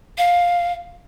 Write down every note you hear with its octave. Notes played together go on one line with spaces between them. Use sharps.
F5